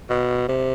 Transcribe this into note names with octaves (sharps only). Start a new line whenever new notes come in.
B2
C3